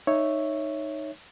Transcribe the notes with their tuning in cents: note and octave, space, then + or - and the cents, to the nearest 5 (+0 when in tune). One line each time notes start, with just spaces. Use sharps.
D#4 -10 C#5 +0 E5 +0